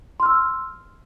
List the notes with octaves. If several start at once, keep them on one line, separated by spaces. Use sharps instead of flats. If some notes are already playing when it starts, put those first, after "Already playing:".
C6 E6 F6